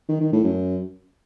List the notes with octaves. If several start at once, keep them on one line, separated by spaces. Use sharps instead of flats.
D#3
D#3
A2
F#2